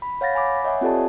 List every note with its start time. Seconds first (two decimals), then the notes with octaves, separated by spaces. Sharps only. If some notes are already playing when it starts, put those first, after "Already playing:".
0.02 B5
0.21 C#5 F5 F#5 A6 A#6
0.34 F#5 G#5 B5 D6
0.64 C#5 D#5 E5 F#5 G#5
0.81 C4 F4 G4 A4 D5 A5